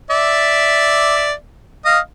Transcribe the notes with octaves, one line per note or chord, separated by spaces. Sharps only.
D5 E5
D#5 F5